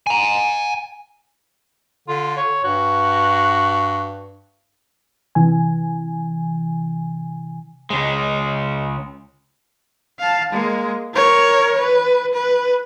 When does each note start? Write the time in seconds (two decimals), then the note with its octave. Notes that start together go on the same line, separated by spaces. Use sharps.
0.07 G#5 A#5
2.08 D3 F4
2.37 C#5
2.64 G2 F#4
5.35 C3 E3 G#5
7.90 C#2 G#3
10.19 F5 A5
10.53 G#3 A#3
11.14 A#4 C#5
11.78 B4
12.34 B4